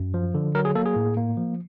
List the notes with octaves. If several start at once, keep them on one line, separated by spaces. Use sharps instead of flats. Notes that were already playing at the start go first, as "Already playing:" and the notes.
Already playing: F#2
F3
D3
F#3 A#4
G#4
A#3 A4
G#4
A2
A#3
F3